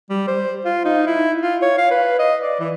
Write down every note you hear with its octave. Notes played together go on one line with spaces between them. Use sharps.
G3
C5
F4
D#4
E4
F4
C#5
F5
B4
D#5
D5
E3